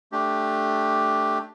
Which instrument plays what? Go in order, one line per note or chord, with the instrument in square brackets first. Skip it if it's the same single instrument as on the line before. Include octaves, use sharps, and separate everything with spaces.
[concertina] A3 D4 G4